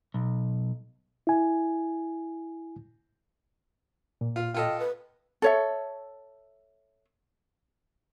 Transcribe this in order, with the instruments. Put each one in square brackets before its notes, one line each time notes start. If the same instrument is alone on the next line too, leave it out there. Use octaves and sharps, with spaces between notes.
[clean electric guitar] B1
[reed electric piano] E4 G#5
A#2
[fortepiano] F4
[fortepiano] F4 A4 D#5 [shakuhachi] G5
[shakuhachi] B4
[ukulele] A4 C#5 E5